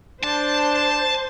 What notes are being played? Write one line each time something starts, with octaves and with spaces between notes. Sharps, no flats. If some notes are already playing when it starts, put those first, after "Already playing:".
D4 C5 A5